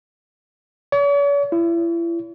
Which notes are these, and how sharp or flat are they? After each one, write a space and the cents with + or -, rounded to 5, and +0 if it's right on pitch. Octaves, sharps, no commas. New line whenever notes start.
C#5 +45
E4 +35